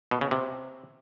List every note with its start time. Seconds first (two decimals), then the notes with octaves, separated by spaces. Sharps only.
0.11 B2
0.21 C#3
0.31 C3